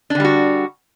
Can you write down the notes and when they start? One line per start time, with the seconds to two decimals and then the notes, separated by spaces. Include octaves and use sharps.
0.10 D4
0.15 D3
0.20 G3
0.25 F#4